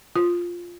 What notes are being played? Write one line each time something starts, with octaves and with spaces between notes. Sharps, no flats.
F4